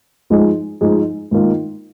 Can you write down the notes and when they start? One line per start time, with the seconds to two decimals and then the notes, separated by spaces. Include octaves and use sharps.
0.30 G#2 F3 G#3 D#4 G#4
0.81 G#2 F3 G#3 D#4 G#4
1.31 G#2 D#3 A#3 F4